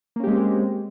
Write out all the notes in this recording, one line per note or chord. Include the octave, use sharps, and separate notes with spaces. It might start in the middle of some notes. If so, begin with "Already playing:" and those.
G#3 A#3 C4 C#4 G4